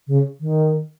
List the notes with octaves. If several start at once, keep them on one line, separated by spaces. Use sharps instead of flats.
C#3
D#3